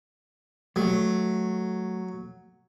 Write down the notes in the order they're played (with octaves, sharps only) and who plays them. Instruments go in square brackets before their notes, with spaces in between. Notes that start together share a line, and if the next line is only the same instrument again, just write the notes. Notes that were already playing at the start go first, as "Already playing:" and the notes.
[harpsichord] F#3 [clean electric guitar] A3